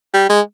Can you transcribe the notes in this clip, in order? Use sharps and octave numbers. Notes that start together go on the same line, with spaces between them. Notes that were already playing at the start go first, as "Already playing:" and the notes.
G3
G#3